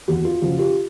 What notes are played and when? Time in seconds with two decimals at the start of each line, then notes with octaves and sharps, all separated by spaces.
0.08 E2 F#4
0.25 F4
0.42 C#3 F3 F#4
0.59 F4 G4